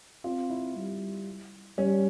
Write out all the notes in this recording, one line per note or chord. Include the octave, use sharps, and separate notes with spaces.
C4 F4
E4
G3
G3 C#4